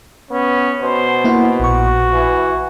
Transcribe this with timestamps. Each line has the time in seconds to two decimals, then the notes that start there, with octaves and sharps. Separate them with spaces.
0.31 B3 C#4
0.82 B2 C5
1.24 A#3 E4 F#5
1.60 A#1 F#4 C#6
2.13 E3